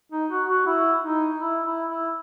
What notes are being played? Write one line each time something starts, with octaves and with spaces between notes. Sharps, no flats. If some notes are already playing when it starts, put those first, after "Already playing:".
D#4
F#4
F#4
E4
D#4
E4
E4
E4